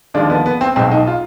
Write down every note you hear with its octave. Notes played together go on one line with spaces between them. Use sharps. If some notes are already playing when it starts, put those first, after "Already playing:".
D#2 D3 F3 G#3 D4
B3
B3
C4
B1 B2 G#3 C4
D#4
F4